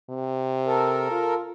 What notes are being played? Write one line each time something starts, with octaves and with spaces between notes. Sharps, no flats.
C3
A4 A#4
F4